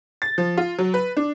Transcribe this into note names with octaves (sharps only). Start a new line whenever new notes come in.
A6
F3
F4
F#3
B4
D4